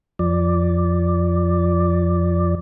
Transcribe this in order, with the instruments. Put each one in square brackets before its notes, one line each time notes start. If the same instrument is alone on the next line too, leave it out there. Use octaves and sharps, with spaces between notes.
[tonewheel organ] F2 F3 D5